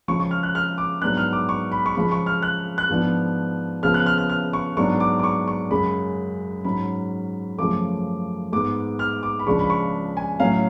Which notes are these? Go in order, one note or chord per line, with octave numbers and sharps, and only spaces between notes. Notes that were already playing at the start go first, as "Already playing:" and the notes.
C#3 F3 G#3 C#6
C#6
F6
F#6
F6
D6
G#2 F#3 B3 D4 F#6
F6
D6
C#6
B5
C#6
C#3 F3 G#3 B5
C#6
F6
F#6
F#6
G#2 F3 B3 D4
C#3 F3 B3 F6
F#6
F6
F6
F6
C#6
G#2 F#3 B3 D4 C#6
D6
D6
C#6
C#6
F#2 C#3 G#3 B5
G#2 F#3 C#4 B5
F#2 C#3 F3 A3 D6
G#2 G#3 B3 D6
F6
D6
B5
C#2 C#3 F3 G#3 D4 C#6
B5
C#6
G#5
A2 F#3 C#4 F5